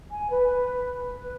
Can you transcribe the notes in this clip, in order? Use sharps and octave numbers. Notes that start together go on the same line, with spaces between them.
G#5
B4
B4